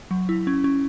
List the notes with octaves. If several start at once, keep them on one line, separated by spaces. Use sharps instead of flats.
F#3
E4
C#4
C#4